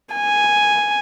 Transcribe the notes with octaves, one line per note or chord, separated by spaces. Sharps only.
G#5